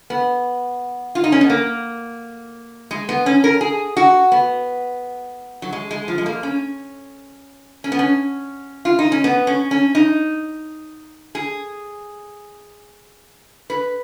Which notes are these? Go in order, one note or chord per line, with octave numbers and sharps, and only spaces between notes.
B3
F4
D#4
C#4
B3
A#3
G#3
B3
C#4
A#4
G#4
F#4
B3
F#3
G#3
G#3
F3
G#3
A#3
C#4
C#4
B3
C#4
F4
D#4
C#4
B3
C#4
C#4
D#4
G#4
B4